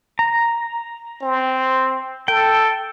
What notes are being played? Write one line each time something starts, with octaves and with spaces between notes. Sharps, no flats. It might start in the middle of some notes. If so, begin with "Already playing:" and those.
A#5
C4
A4 G5